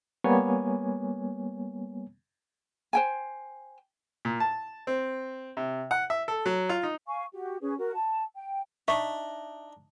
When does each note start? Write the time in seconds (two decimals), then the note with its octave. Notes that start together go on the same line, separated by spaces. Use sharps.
0.24 G3 A#3 B3 C#5 G#5
2.93 C5 G5 G#5
4.25 A#2
4.40 A5
4.87 C4
5.57 C3
5.91 F#5
6.10 E5
6.28 A4
6.46 F#3
6.69 F4
6.83 D#4
7.07 F5 G#5 C#6
7.33 F#4 G4
7.61 C#4 G#4 B4
7.78 F#4 A#4
7.94 A5
8.36 G5
8.88 D4 D#4 E5 C#6